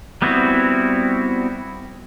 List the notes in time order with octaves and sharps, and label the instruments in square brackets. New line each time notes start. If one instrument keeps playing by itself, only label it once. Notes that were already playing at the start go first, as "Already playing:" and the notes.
[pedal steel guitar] G3 B3 C4 E4 F#4